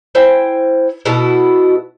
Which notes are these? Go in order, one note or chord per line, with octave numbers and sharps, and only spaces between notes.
E4 C5 G5 G#5
B2 E4 F#4 A4